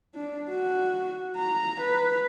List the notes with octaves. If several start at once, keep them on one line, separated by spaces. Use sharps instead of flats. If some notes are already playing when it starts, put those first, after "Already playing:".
D4
F#4
A#5
B4